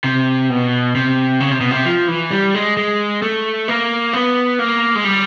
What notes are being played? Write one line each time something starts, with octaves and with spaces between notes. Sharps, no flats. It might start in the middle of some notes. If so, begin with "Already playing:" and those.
C3
B2
C3
C#3
C3
B2
C3
F3
E3
G3
G#3
G#3
A3
A#3
B3
A#3
G#3
G3